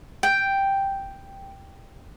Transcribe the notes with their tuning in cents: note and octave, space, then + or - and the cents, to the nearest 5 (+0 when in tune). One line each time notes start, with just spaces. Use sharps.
G5 +0